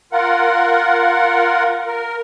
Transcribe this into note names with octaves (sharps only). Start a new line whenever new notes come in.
F4 A#4 F#5
A#4